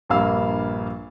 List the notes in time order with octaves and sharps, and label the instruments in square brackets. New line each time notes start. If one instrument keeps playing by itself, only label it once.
[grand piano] A#1 G2 A#3 F5 E6